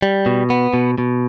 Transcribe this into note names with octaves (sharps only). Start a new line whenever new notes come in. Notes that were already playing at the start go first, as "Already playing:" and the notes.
G3
B2
B3
B2
B2